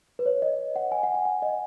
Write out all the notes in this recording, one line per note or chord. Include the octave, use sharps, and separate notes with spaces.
B4
C#5
D#5
F#5
G#5
F#5
G#5
F#5
D#5